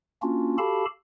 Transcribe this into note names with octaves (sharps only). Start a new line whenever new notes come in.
A#3 C#4 D4 F4 F#4
F#4 G4 A4 F5 A5 B5